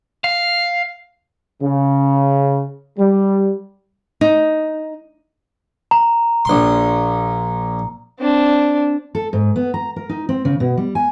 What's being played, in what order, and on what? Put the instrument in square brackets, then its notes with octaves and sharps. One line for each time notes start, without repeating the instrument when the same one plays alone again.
[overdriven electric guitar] F5
[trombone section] C#3
G3
[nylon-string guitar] D#4
[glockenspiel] A#5
[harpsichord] A#1 C6
[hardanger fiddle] C4 D4
[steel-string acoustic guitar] A4
G#2
B3
A#5
A#4
D#4
C4
C#3
B2
G3
G#5